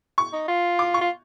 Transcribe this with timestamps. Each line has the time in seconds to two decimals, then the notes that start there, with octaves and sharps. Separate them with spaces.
0.18 C#6
0.33 D#4
0.48 F4
0.79 D6
0.94 C#6
1.01 F4